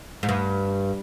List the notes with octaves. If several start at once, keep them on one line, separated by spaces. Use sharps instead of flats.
G#2
G2